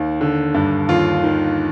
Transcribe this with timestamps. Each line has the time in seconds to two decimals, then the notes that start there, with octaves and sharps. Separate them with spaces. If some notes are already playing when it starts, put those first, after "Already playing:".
Already playing: D#2 D#3
0.21 D3
0.54 G2
0.89 D#2 F4
1.24 D#3